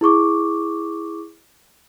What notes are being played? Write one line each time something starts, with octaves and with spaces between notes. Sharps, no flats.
E4 G#4 C#6 D6